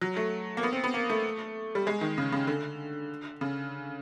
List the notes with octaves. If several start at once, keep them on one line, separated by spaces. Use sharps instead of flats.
F#3
A3
A#3
B3
C4
B3
A#3
A3
G3
G#3
D#3
C#3
C#3
D3
C#3